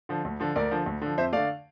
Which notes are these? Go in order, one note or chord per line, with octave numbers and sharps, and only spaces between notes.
D3 F3
D2
D3 F3
D2 A#4 D5
D3 F3
D2
D3 F3
F2 C5 E5
D3 A3 D5 F5